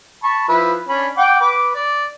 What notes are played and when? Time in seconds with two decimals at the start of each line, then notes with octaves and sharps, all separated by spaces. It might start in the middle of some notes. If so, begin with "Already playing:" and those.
0.23 A5 B5 C#6
0.48 F3 E4 B4
0.89 C#4 D4 B5
1.17 F#5 G5 D6
1.41 B4 D6
1.75 D5